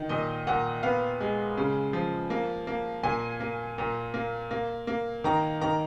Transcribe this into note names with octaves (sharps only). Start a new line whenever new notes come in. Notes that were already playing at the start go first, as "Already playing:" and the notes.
Already playing: D#3
A#2 D#5
A#2 F#5
B3 F5
G#3
C#3
F3
A#3
A#3
A#2 G#5
A#3
A#2
A#3
A#3
A#3
D#3 A#5
D#3 A#5